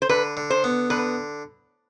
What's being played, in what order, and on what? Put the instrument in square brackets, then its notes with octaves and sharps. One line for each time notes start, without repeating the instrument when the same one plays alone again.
[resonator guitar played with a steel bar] C5
[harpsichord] D3 [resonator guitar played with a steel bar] B4
[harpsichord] D3
[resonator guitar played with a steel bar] C5
[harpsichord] B3
[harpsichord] D3 [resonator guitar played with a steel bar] B4